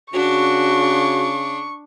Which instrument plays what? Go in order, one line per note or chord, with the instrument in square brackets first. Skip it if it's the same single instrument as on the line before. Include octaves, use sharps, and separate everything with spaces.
[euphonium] C#3 [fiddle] D4 [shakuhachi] F#4 [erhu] C#6